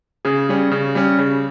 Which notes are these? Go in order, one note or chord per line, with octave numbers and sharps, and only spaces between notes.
C#3 G#4
G3 C#4
C#3
G3 C#4
C#3